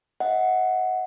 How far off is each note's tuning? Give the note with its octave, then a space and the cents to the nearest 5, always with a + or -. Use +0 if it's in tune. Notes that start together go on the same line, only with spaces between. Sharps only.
D#5 +40 F#5 +0